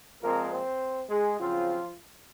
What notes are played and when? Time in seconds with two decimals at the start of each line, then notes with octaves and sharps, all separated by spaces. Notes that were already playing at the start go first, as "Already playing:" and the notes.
0.21 A#2 F3 G#3 A#3 C4 A#4
0.50 C4 C5
1.09 G#3 G#4
1.38 C#3 F3 F#3 C4 F4